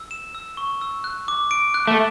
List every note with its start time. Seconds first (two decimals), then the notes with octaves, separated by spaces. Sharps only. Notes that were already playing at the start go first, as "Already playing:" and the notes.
Already playing: E6
0.11 E7
0.35 E6
0.57 C#6
0.81 E6
1.04 F#6
1.28 D6
1.51 D7
1.74 F#6
1.87 A3